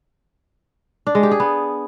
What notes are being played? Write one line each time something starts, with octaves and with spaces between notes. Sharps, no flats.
D4
G#3
G4
G#4
B3